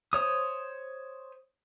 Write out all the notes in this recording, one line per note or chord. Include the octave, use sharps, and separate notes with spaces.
C5 C#5 D#6